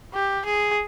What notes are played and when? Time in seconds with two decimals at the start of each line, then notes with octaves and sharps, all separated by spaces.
0.13 G4
0.45 G#4